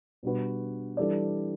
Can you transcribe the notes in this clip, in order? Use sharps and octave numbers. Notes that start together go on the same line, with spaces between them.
B2 G3 D4 F#4 B4
E3 G3 D4 A4 D5